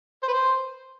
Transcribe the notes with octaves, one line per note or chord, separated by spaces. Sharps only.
C5
B4
C5